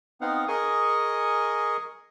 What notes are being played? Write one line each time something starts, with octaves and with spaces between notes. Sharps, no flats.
B3 C4 D#4 F5 F#5
G#4 A#4 D#5 G#5 C#6 D#6